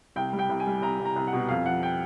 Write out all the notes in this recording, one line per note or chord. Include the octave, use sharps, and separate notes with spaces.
C2 G5
G3
G5
C2
G#5
G3
C2 A#5
C2
A#5
C2
F#5
B2
F2 F5
F3 F#5
G5